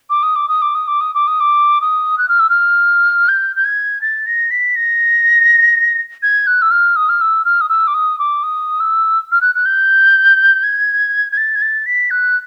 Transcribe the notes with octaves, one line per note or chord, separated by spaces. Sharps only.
D6
D#6
D6
D#6
D6
D#6
D6
D#6
D6
D#6
D6
D#6
F#6
F6
E6
F6
G6
G6
G#6
A6
A#6
B6
A#6
G#6
F#6
E6
F6
D#6
F6
E6
F6
D#6
E6
D6
D#6
D6
D#6
E6
F6
F#6
F#6
G6
G#6
G#6
A6
G#6
A6
B6
F#6